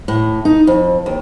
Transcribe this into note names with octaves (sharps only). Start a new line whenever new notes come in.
A2
D#4
F2
D#2